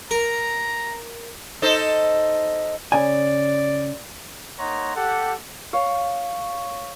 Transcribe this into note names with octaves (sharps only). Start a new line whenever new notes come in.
A#4 A#5
D#4 A4 C5
C#3 D5 G#5
A#3 D#4 C#5 F#5 A#5 C6
G4 A4 F#5
C#5 F5